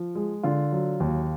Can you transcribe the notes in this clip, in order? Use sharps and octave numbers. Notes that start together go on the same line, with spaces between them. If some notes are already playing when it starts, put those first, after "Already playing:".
Already playing: F3
G#3
D3 F4
F#3
D#2